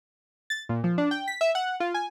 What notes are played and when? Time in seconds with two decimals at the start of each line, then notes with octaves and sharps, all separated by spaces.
0.50 A6
0.69 A#2
0.84 F3
0.98 D4
1.11 G5
1.28 B6
1.41 E5
1.55 F#5
1.80 F4
1.94 G#5